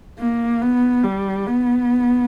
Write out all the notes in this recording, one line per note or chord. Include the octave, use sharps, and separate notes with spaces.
A#3
B3
G3
B3